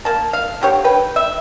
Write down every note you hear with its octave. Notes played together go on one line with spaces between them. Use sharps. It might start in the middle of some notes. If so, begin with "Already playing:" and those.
A#3 A5
F5
D3 G4 C#5
B4 G5
E5